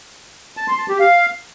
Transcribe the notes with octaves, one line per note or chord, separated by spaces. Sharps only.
A5
C6
A5
G4
F5